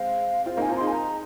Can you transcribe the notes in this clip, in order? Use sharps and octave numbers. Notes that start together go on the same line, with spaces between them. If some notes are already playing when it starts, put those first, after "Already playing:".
Already playing: G#3 C4 F5
C4 F4 F5
A#3 D#4 G#5
C4 F4 A#5
D#4 G#4 C6
G#5
A#5